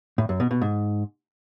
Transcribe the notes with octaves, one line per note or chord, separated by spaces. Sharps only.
A2
F#2
B2
B2
G#2